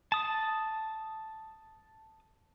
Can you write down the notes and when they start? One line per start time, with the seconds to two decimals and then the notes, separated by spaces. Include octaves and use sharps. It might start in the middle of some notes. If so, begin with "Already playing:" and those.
0.12 A5 D#6